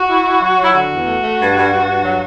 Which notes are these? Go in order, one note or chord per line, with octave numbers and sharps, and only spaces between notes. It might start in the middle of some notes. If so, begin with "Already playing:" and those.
Already playing: F#4
E4
E4
F#3
F#3
E4
D3 F#4
E2
A3
A3
G2
G2
G2
G2
F#3